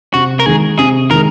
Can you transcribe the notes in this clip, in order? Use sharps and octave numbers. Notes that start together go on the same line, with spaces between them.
C3 F#4
A#4
D#3 G#3 G#4
C3 G#4
D#3 G#3 A#4